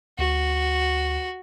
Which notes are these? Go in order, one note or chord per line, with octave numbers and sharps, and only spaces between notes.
D2 F#4